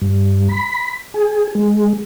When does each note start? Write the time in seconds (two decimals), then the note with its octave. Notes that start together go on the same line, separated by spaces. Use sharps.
0.02 G2
0.49 B5
1.14 G#4
1.55 G#3